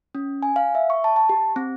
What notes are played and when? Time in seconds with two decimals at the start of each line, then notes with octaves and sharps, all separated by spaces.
0.15 C#4
0.42 G#5
0.56 F5
0.75 E5
0.90 C#6
1.04 A5
1.16 A5
1.29 G4
1.56 C4